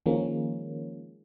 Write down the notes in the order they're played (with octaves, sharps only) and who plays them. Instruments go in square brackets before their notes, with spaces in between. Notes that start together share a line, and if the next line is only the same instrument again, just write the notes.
[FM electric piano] D#3 F3 G#3 A#3 C#4